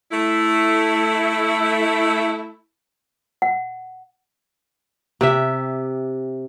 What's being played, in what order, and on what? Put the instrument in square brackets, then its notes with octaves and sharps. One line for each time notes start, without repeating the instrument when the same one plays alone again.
[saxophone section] A3 E4
[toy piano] F#5
[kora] C3 G4 E5